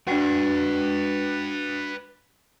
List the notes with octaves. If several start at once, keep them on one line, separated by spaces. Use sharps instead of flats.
D4 F#4 B4 G5